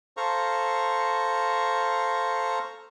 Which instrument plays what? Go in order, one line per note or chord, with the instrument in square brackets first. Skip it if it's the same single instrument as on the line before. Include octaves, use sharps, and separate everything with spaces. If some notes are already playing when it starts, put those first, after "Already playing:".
[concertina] A4 C5 F5 A#5 C#6